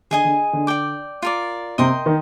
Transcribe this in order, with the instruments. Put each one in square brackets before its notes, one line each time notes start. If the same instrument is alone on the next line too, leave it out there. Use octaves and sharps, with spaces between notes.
[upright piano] D3 [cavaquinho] G#4 D#5 G#5
[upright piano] D3
D3
[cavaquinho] D5 G5 D6
F4 A#4 D5
[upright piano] C3 [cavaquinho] A#4 D#5 G5 C6
[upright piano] D#3